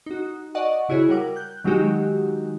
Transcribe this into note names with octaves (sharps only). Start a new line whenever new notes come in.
D#4 F#4
D5 D#5 F#5 C#6
C#3 E4 F#4 G#4 C#5
G3 A#4 F#5 D6
F#6 G6
D#3 F#3 G#3 D#4 F#4 G4